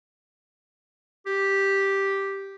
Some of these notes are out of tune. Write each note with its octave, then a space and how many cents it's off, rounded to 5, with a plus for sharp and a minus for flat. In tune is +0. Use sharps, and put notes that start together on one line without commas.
G4 +0